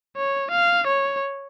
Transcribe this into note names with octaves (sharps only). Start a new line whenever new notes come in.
C#5
F5
C#5